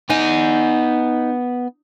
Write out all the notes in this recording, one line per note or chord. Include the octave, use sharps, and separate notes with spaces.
B3 D#4 G#5